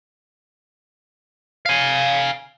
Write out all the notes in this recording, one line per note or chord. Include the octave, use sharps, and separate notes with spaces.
F5 G#5